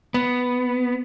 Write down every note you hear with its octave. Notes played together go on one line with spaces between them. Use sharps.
B3